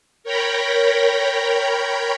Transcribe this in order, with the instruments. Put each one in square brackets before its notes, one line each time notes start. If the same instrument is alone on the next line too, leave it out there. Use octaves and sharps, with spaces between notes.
[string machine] A#4 C#5 G5 A#5 B5